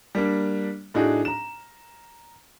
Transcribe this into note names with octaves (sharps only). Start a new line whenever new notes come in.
G3 A#3 D4
A2 D4 D#4 F#4 G#4
A#5 E7